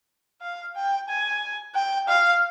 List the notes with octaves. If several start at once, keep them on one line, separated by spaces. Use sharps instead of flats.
F5
G5
G#5
G5
F5